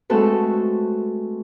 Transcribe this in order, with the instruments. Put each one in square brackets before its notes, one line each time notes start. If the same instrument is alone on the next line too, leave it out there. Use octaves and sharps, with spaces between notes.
[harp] G#3 A3 C4 F#4 A4 B4